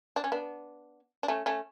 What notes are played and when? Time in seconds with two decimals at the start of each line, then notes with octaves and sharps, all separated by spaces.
0.16 D4
0.24 C#4
0.32 B3 D4
1.23 D4
1.28 A3 C#4
1.46 A3 C#4